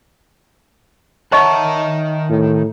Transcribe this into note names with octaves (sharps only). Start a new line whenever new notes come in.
D#3 C#5 D#5 E5 F#5 A5 A#5 C#6
A2